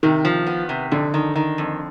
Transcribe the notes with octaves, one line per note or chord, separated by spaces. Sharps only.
C3 D#3
F3
B3
C3
F2 D3
D#3
D#3
F2